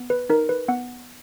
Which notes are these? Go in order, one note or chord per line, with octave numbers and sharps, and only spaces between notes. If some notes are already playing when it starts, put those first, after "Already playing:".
Already playing: B3
B4
D#4 A#4
B4
B3 F#5